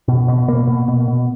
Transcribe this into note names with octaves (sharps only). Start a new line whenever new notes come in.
B2
B2
B2 A#3
B2
B2
B2